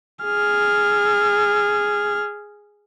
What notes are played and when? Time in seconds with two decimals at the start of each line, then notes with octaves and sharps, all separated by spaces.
0.25 G#4 F6